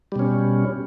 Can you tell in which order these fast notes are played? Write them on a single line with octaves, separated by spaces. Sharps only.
G3 B2 C#4